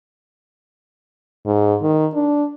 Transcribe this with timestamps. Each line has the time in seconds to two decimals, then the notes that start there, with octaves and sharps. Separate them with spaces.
1.46 G#2
1.82 D#3
2.14 D4